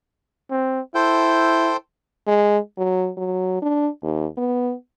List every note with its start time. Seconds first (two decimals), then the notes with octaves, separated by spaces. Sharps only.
0.51 C4
0.95 E4 A4 C5 G5
2.27 G#3
2.78 F#3
3.17 F#3
3.62 D4
4.03 D#2
4.38 B3